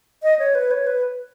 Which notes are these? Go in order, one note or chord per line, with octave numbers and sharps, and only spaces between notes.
D#5
C#5
B4
C#5
B4